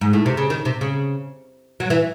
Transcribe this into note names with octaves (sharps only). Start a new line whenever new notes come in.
G#2
A2
C3
C#3
D#3
C3
C#3
F#3
E3